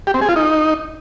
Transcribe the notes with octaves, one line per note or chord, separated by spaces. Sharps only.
G4
C4
G#4
F4
D#4